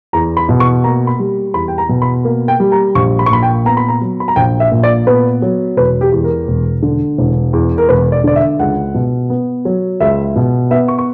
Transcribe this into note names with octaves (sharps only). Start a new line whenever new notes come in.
E2 A#5
B5
B2
C#6
A#3 A#5
B5
G3
E2 B5
G5
A#5
B2
B5
A#3
G5
G3
A#5
A#1 C#6
B5
C#6
A#2 B5
G5
B3 A#5
B5
A#5
F#3
B5
A#5
A#1 G5
E5
A#2
D5
B3 B4
F#3
E1 B4
G4
E2
A#4
E1
D3
E1
E2
A#4
E1 B4
D5
D3 D5
E5
C#2 F#5
B2
B3
F#3
C#2 E5
B2
B3 E5
C#6
C#6